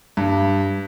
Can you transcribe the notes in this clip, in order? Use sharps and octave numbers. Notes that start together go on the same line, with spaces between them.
G2